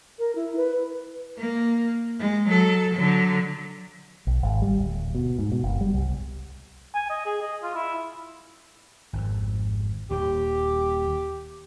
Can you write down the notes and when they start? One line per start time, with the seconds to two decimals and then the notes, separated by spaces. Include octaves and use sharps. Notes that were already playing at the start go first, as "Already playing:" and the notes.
0.19 A#4
0.35 E4
0.56 B4
1.38 A#3
2.19 G#3
2.48 F#3 A4
2.94 D3 F#3
4.27 B1
4.43 G#1
4.62 G3
4.78 D1
5.15 B2
5.38 G#2
5.52 B2
5.64 F#1
5.81 G3
5.94 C2
6.95 G#5
7.10 D#5
7.26 G#4
7.41 D#5
7.63 F4
7.75 E4
9.13 G#1 F2
10.11 D#1 D#2 G4